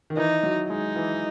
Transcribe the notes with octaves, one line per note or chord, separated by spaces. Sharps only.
D#3
E3 D#4
F#3
G#3 D#4
E3